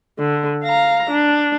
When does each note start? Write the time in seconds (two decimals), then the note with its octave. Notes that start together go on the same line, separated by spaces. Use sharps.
0.19 D3
0.64 F5 A#5
1.10 D4